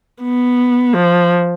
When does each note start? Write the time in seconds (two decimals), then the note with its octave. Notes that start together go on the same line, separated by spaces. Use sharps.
0.23 B3
0.95 F3